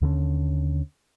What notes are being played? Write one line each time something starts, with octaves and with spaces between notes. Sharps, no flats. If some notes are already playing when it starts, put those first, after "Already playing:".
D#2 D3 F#3 C#4